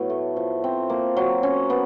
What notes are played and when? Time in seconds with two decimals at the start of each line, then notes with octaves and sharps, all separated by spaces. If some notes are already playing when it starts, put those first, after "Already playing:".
Already playing: A2 F#3 B3
0.10 A3
0.37 F3
0.64 C4
0.90 A#3
1.17 F#3
1.43 C#4
1.70 B3